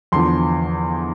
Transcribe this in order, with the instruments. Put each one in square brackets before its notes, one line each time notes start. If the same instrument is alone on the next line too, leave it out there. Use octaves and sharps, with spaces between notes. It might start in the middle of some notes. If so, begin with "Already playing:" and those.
[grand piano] E2 D3 F3 C6